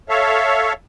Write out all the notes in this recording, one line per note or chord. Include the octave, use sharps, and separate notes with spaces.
A4 C#5 E5 F5